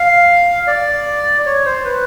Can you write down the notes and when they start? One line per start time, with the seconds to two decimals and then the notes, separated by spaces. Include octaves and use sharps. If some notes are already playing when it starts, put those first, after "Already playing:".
Already playing: F5
0.67 D5
1.46 C#5
1.65 C5
1.85 B4